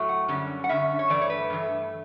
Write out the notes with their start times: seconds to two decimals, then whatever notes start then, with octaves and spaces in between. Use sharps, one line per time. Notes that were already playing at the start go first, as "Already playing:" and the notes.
Already playing: A2 F#3 A3
0.09 F#5
0.28 F#2 D3 G3 C#4
0.64 F#5
0.69 F#2 D3 G3 C#4 E5
0.99 C#5
1.10 G2 E3 A3 D5
1.21 C#5
1.30 B4
1.50 G2 E3 A3